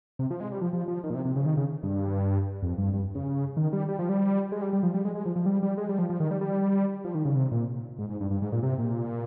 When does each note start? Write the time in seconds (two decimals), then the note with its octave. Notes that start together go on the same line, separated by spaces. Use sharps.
0.19 C3
0.31 F3
0.40 G#3
0.52 G3
0.61 F3
0.73 F3
0.88 F3
1.04 D#3
1.10 A#2
1.14 C3
1.25 C3
1.36 C#3
1.46 D#3
1.57 C#3
1.83 G2
2.63 F2
2.78 G2
2.94 G2
3.15 C#3
3.57 D#3
3.73 G3
3.88 G3
3.99 F3
4.09 G3
4.52 G#3
4.62 G3
4.73 G3
4.83 F3
4.94 G3
5.05 G#3
5.15 G#3
5.26 F3
5.36 F3
5.46 G3
5.63 G3
5.78 G#3
5.89 G3
5.99 F3
6.10 F3
6.20 D#3
6.31 G3
6.41 G3
7.05 F3
7.15 D#3
7.25 C#3
7.35 C3
7.52 A#2
7.99 G#2
8.10 G#2
8.20 G2
8.31 G2
8.42 G#2
8.52 A#2
8.63 C3
8.79 A#2